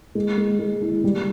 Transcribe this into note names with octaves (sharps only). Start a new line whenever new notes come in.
G#3
G#3
G#3
E4
G3